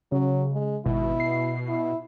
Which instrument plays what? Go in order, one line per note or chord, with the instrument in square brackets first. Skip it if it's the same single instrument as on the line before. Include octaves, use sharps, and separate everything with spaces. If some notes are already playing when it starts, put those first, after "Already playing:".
[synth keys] C#3 [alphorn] F#3
[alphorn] G#3
[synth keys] G#1 [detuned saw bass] B2 [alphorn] E4
[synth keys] C7
[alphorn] E4